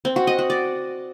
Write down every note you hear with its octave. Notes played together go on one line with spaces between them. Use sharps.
C4
F#4
D#5
F#4
D5